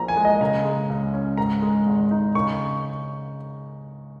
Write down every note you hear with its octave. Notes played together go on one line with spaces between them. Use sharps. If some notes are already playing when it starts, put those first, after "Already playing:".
Already playing: A#1 A#2 F3 A#5
G#5
G#3
D#5
C#3 A#5
G#3
C#2
C#4
G#2 A#5
G#3
G#1
D#4
C#3 C#6